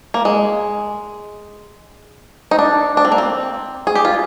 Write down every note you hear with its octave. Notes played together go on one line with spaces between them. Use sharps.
A#3
G#3
D#4
D4
D4
C4
A#3
C4
G#4
G4
F4